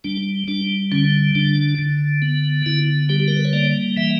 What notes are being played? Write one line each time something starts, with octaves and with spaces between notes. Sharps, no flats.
G3 D4
G3 D4
D3 C#4
D3 D4
D3
B3
D3 E4
G3 G4
G4
A#4
B4
C#5
A#3 D5
E3 E5